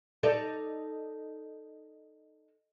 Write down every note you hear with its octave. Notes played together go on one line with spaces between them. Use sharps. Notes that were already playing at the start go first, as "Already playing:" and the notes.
D#4 A4 D5